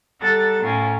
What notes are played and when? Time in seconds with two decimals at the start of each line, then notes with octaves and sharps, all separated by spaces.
0.21 G3 A4 F#5 A#5 A6
0.63 A2 C#4 F4 A#4